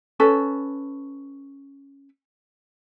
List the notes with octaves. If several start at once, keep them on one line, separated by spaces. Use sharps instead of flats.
C#4 A4 B4